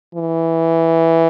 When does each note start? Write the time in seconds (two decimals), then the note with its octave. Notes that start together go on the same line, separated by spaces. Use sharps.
0.15 E3